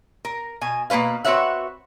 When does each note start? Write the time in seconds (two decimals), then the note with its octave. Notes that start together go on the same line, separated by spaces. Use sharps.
0.25 A#4
0.61 B2 G#5
0.90 B2 A#3 C#4 B4 F5
1.24 C4 F#4 B4 C#5 E5 F#5